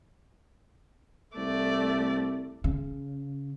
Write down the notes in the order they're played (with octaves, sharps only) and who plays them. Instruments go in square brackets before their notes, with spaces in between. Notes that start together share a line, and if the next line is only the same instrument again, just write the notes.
[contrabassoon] C2 [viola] A3 D5
[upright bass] C#3